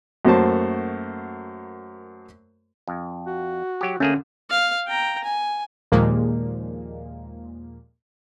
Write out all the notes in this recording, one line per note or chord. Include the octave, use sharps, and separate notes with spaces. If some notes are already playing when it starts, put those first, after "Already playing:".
F#2 A3 A#3 F#4 C5 A5
F2
F#4
F#3 G4
D3 A3 A#3 C#4 G#4
F5
G5 A#5
G#5
D#2 A#2 F3 G#3 A#3